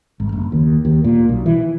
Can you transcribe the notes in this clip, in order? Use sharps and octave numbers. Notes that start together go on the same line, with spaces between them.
G#1
F#1
D#2
D#2
A#2
B1
E3